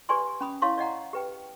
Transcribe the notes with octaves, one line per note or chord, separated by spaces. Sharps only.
G4 B4 D5 G#5 C6 C#6
C#4 B5 D#6
E4 C#5 F5 A5 C6 C#6
D5 D#5 F#5 A#5
G4 B4 G5